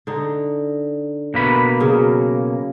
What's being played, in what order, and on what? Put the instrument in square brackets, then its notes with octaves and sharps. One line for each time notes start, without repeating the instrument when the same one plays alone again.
[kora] D3 D#4
[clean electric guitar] B2 A#3 B5
[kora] C#3 F#3